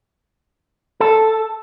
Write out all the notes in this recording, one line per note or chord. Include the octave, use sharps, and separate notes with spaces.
A4